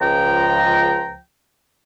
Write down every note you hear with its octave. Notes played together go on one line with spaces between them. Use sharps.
C#2 F3 G5 A#5